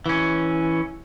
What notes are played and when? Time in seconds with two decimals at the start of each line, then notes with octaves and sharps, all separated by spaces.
0.06 E3 C#4